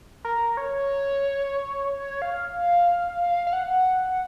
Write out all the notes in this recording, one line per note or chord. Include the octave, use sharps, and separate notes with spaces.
A#4
C#5
F5
F5
F#5